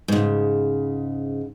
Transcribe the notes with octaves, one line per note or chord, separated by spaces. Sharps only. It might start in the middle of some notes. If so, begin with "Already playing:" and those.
G#2 C#3